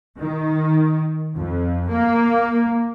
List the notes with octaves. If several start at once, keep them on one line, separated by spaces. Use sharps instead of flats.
D#3
F2
A#3